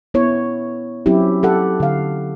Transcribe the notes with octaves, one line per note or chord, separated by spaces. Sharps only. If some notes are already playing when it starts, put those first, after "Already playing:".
B3 E4 C#5
F#3 C4 C#4 E4 G4
G4 A4 F#5
D3 F5